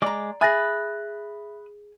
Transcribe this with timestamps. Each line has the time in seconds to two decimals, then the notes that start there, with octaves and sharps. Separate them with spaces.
0.02 G#3 D5 A#5 D6
0.41 G#4 E5 G#5 B5 D#6 F#6 A6 A#6